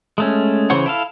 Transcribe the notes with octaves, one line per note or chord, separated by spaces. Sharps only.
G#3 A3 C#4
C#3 E3 C5 C#5 F#5
E4 A4 F5